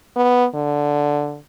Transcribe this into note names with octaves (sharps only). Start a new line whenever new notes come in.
B3
D3